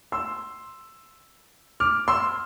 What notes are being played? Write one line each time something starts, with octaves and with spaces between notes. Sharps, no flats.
C6 E6
D6 F6
C6 E6